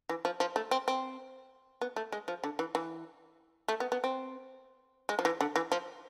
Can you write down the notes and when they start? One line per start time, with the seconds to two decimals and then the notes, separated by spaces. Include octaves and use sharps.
0.09 E3
0.25 F3
0.40 F3
0.56 A3
0.71 C4
0.88 C4
1.81 B3
1.96 A3
2.12 G#3
2.28 F3
2.44 D3
2.59 E3
2.75 E3
3.68 A3
3.80 B3
3.92 B3
4.04 C4
5.09 G#3
5.19 F3
5.25 E3
5.41 D3
5.56 E3
5.72 F3